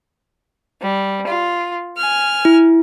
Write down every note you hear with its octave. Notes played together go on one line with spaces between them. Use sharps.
G3
F4
G#5 F6
E4